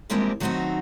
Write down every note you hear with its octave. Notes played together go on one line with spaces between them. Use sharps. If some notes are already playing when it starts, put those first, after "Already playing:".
E3 F3 G3 G#3 A#3 C4
D#3 F#3 A3 C4 D#4 F#4